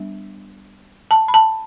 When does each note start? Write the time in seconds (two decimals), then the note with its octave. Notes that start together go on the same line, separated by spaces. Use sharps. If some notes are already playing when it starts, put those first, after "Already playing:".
Already playing: G3 B3 D4
1.11 A5
1.28 B5
1.34 A5